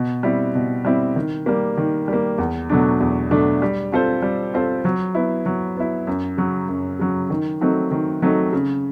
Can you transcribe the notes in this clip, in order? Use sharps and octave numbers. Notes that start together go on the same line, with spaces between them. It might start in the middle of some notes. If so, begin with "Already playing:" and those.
Already playing: B2
G3 C4 E4
B2
G3 C4 E4
D#3
G3 A#3
D#3
G3 A#3
E2
B2 F#3 A3 D4
E2
B2 F#3 A3 D4
G3
C4 F4 A4 C5
G3
C4 F4 A4 C5
F#3
B3 E4
F#3
B3 E4
F#2
C#3 F#3
F#2
C#3 F#3
D#3
F#3 A3 C4 D#4
D#3
F#3 A3 C4 D#4
C#3